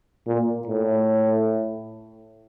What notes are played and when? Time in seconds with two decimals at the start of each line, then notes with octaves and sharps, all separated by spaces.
0.27 A#2
0.67 A2